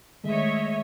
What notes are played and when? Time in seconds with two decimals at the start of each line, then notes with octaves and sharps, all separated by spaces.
0.24 D#3 G#3 A3 C#5 D#5 E5